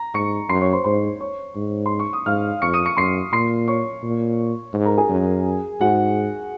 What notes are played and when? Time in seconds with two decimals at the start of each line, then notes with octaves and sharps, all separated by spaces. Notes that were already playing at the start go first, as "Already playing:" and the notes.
Already playing: A#5
0.14 G#2 C#6 C#7
0.49 F#2 C6 C7
0.61 C#5 C#6
0.73 C5 C6
0.84 G#2 C5 C6
1.20 C#5 C#6
1.56 G#2
1.86 C6
1.99 C#6
2.13 D#6
2.26 G#2 F5 F6
2.62 F2 C#6 C#7
2.74 D#6 D#7
2.85 C#6 C#7
2.97 F#2 C6 C7
3.33 A#2 C6 C7
3.68 C#5 C#6
4.03 A#2
4.74 G#2
4.86 A#4 A#5
4.98 G#4 G#5
5.09 F#2
5.80 G#2 F#4 F#5